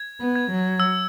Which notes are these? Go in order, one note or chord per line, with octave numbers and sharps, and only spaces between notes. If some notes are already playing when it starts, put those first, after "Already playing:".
Already playing: G#6
B3
G#6
F#3
E6